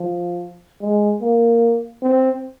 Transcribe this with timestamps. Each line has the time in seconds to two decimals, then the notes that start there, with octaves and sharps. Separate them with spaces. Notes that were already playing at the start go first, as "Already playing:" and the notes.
Already playing: F3
0.81 G#3
1.21 A#3
2.02 C4